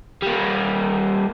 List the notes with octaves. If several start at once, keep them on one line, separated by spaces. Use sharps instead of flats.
G3 A#3